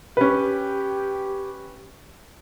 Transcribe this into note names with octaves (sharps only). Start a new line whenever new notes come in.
C#4 G4 B4